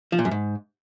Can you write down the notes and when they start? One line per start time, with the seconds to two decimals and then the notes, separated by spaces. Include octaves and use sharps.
0.12 F3
0.19 A#2
0.25 F#2
0.31 G#2